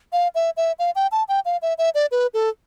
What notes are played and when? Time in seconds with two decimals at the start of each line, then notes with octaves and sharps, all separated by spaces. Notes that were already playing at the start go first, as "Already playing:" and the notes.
0.13 F5
0.35 E5
0.57 E5
0.79 F5
0.95 G5
1.12 A5
1.28 G5
1.45 F5
1.62 E5
1.78 E5
1.95 D5
2.11 B4
2.34 A4